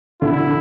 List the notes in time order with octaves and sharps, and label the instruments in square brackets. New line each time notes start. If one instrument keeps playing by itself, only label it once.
[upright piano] D3 [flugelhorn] E4